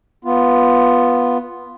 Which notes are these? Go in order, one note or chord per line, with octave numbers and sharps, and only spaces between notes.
B3 F4